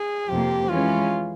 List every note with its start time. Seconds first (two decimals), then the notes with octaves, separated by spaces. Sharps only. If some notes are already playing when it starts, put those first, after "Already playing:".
Already playing: G#4
0.28 F2 C3 F3 A#3 G4
0.68 E3 G#3 C#4 F4